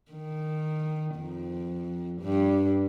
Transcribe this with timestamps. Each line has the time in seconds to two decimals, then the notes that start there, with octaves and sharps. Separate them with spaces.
0.11 D#3
1.16 F2
2.21 G2